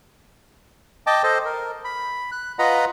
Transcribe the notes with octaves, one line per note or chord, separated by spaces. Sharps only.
D#5 G5 A5 D6
A4 C5 D#5
A#4
B5
F#6
F4 B4 D#5 F#5 A#5 B5